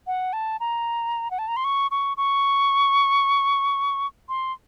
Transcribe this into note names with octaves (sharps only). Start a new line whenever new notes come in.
F#5
A5
A#5
F#5
A5
A#5
C6
C#6
C#6
C#6
C6